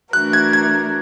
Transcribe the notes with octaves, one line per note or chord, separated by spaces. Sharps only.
E3 A3 D4 F#4 A#4 F#6
G#6
G#6